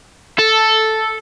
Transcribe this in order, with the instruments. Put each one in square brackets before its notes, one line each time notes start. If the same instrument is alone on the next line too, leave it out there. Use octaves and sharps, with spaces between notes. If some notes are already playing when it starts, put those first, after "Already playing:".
[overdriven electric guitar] A4